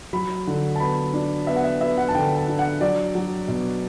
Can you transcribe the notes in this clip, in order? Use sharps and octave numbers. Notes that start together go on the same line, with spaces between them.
F#3 B5
D3
A5
B3 B5
D4
B3 E5
F#5
E5
B3 E5
F#5
A5
D3 G5
A5
D4
F#5
F#3 D5
F#3
B2